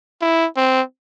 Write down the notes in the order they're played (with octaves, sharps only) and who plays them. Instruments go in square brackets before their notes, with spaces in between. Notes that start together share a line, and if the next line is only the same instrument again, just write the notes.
[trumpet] E4
C4